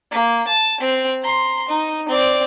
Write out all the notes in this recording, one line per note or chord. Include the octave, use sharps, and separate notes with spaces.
A#3
A5
C4
A#5 C6
D#4
C4 D5